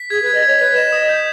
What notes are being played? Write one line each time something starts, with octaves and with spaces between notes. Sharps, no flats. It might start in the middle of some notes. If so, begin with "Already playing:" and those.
Already playing: B6
G#4 G#6
B4 G#6
D#5
C#5 G#6
B4 B6
D#5 E7
D#5 D#6
G6